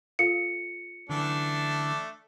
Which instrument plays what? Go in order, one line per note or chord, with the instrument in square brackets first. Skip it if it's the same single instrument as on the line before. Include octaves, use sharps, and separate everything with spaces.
[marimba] F4 A4 F5 [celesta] C#7
[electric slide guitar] D3 E3 [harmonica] A3 D4